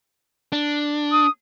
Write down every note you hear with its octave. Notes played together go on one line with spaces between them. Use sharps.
D4
D#6